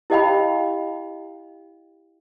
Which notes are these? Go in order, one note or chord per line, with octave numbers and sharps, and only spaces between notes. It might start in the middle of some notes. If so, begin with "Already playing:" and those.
E4 G4 D#5 F5 G5 B5